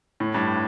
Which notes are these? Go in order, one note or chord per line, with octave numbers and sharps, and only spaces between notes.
A2
G2